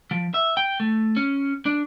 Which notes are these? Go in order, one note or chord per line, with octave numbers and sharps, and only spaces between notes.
F3
E5
G5
A3
C#4
D4